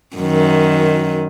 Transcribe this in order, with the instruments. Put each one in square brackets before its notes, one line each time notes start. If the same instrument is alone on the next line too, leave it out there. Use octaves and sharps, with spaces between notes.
[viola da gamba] F#2 D#3